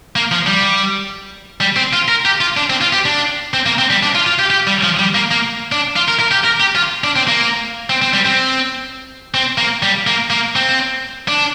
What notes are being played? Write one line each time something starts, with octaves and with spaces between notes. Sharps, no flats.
A#3
F3
G3
G3
C4
F4
A#4
G4
F4
D4
C4
F4
G4
D4
C4
A#3
C4
G3
D4
F4
F4
G4
G4
G3
F3
G3
A#3
A#3
D4
F4
A#4
A#4
G4
A#4
G4
F4
D4
C4
A#3
C4
C4
G3
C4
C4
A#3
G3
A#3
A#3
C4
D4